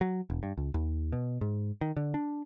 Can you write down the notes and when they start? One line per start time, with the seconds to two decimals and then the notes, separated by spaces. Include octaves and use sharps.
0.01 F#3
0.30 E1
0.43 G2
0.58 C#2
0.74 D#2
1.12 B2
1.41 G#2
1.81 D#3
1.97 D3
2.14 D4